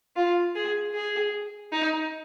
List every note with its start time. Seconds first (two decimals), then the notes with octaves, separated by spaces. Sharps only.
0.16 F4
0.55 G#4
0.94 G#4
1.73 D#4